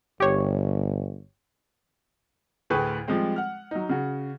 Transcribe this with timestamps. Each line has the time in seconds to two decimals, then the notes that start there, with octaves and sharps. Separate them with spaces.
0.20 G1 G4 C#5
2.70 D2 A2 G#4 B4 C#6 G6
3.07 F3 G3 G#3 C4
3.36 F#5 F6
3.71 F#3 D#4
3.89 C#3 F#4